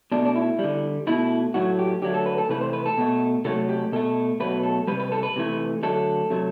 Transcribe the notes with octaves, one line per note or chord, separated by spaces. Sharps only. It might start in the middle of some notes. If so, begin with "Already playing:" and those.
B2 A3 D4
D4
E4
G3
D3
B2 A3 E4
A2 F#3 A3 F#4
G4
D3 F#3 A3 G4
A4
B4
A4
C3 E3 A3 B4
C5
B4
A4
B2 A3
C3 F#3 A3 A4
G4
B2 A3 A4
B2 F#3 A3 B4
A4
C3 G3 B4
B4
A4
B4
C3 E3 A3
D3 F#3 A3 A4
C3 F#3 A3